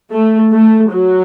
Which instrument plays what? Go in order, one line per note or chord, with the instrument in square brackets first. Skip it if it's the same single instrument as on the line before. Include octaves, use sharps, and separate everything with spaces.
[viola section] A3
A3
F#3